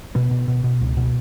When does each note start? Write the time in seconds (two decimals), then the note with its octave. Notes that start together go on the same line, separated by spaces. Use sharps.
0.15 B2 B3
0.31 B2
0.48 B2
0.64 B2
0.81 C#2
0.97 B2